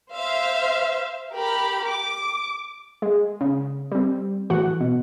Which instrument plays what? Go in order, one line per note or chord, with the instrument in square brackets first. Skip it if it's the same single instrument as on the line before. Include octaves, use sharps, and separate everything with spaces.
[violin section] C5 E5 F5
G4 A#4 B5
D6
[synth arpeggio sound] G#3
C#3
G3 C4
A2 E3 F#4 F#5
B2